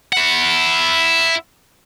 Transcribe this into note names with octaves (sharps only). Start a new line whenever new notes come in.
E4 F#5